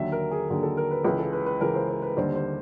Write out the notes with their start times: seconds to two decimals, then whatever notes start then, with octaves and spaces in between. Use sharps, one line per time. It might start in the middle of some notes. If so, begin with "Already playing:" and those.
Already playing: D#2 D3 F#3 E5
0.12 A#4
0.31 G#4
0.49 D#2 D3 F#3 G#4
0.63 A4
0.77 A#4
0.91 B4
1.04 C#2 C#3 E3 B4
1.19 A4
1.33 B4
1.46 B4
1.60 C#2 C#3 E3 A#4
1.75 C5
1.89 C5
2.02 B4
2.17 D#2 D3 G3 C5
2.35 C5